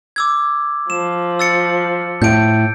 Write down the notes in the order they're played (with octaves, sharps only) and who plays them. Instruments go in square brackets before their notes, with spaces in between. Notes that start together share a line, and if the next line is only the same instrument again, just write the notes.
[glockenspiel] D6 E6 G#6
[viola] F3 [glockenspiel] E7
[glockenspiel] E6 A6 C#7
[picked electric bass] A2 [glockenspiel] G6 D7